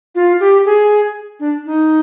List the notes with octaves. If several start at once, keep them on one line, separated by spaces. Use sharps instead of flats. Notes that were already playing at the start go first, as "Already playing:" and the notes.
F4
G4
G#4
D4
D#4